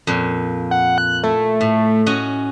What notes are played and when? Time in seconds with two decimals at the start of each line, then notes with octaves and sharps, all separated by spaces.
0.07 F2 A#2
0.71 F#5
0.98 F#6
1.23 A3 E4
1.61 A2
2.06 C#4 F#4 D#5